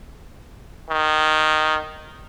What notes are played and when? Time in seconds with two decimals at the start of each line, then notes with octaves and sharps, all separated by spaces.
0.90 D#3